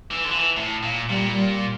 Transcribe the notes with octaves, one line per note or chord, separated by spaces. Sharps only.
E3
D3
E3
A2
A#2
A#2 G3